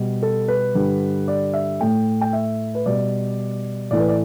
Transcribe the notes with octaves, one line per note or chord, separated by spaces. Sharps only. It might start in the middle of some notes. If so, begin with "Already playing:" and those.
Already playing: B2 G3
A4
B4
G2 D3 G3
D5
E5
A2 A3 G5
G5
E5
B4
B2 G3 D5
A2 E3 A3 D5
B4
D5